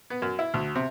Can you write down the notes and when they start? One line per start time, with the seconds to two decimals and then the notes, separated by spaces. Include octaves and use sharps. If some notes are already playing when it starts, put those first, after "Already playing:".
0.10 B3
0.22 F#2
0.39 E4
0.54 D2
0.75 C3